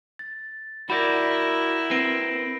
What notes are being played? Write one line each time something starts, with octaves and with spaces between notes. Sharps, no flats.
A6
E4 F#4 A#4 D5 B5 G6 A#6
C4 B4 A#6 C7 D7